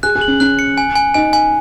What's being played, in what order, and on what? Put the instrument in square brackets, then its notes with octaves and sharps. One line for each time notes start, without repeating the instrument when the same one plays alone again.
[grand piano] G#4 [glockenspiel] F#6
[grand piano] G#4
[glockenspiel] F#7
[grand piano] C#4
[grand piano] C#4 [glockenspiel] F#6
[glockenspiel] C#7
G#5
G#5
[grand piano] D#4 [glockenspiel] G#5
[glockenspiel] G#5